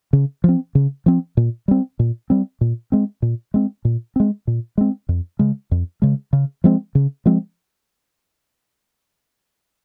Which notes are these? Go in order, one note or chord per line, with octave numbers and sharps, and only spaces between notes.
C#3
F3 C4
C#3
F3 C4
A#2
G3 C4
A#2
G3 C4
A#2
G#3 C4
A#2
G#3 C4
A#2
G#3 C4
A#2
G#3 C4
F2
C#3 G#3
F2
C#3 G#3
C#3
F3 G#3 C4
C#3
F3 G#3 C4